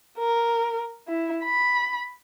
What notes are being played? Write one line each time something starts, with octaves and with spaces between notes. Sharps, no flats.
A#4
E4
B5